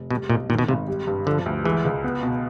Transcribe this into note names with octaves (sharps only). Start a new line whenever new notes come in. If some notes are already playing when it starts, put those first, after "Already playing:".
Already playing: F1
B2 G3
B1 A#2
A#2 D#3
B2
G#1 C3
G3
G2
D3 F3
D2
E3 G#3
C#2
B3
B2